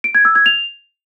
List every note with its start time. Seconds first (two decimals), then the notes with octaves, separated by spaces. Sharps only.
0.04 D7
0.15 G#6
0.25 E6
0.35 G#6
0.46 F7